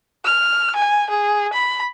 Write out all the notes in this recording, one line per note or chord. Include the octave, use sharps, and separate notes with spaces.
F6
G#5
G#4
B5